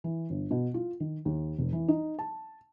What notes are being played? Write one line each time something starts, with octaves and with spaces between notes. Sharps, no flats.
E3
G1
B2
F4
D#3
D#2
F1
E3
D#4
A5